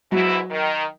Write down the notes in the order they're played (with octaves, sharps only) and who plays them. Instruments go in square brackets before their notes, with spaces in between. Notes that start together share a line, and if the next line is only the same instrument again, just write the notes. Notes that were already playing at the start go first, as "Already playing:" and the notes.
[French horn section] G#2 B2 E4 [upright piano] F#3
[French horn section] D#3